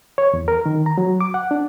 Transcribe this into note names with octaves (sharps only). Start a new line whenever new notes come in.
C#5
E2
A#4
D#3
A#5
F#3
D6
F#5
D4